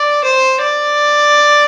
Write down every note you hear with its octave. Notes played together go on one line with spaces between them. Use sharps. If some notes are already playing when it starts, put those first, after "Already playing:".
Already playing: D5
C5
D5